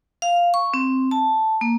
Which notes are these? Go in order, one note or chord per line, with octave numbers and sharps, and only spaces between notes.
F5
C#6
C4
A5
A#3